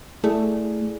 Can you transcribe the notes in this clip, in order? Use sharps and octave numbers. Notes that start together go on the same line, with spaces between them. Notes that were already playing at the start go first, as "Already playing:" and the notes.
A3 E4 G#4 D5